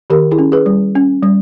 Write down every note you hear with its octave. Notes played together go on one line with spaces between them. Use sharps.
D#3 G4 A#4
E4 G#4
C#4
G#4 B4
G3
C#4
G3